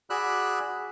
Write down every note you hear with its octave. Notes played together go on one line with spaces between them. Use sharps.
F#4 G#4 D5 B5 E6 F#6